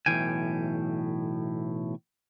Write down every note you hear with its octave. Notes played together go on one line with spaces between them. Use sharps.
B1 F2 A2 E3 G5 G#5